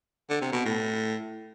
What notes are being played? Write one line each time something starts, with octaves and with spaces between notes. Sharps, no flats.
D3
C3
B2
A2